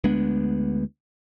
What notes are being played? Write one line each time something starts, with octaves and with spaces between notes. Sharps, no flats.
D2 G#3 B3 D4